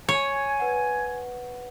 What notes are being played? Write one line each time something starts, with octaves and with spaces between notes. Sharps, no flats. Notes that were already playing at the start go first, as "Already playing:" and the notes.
C#5 G#5
B4 F#5